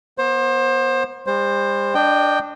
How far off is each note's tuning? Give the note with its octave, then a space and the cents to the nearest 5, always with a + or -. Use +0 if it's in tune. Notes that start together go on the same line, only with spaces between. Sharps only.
B3 -30 C5 +25
G3 +45 C5 +15
D4 +0 D#5 -30 G5 +0